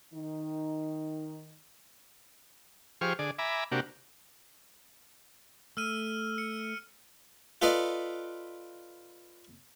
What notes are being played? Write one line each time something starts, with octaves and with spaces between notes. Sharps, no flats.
D#3 D#4
F3 G4 G#4 C5 C#6 F6
D3 G#4 D5
E5 G#5 A#5 B5 D6
C3 A#3 D4 F#4 G4
A3 E6 F6 D#7
C#7
F4 A4 B4 D5 D#5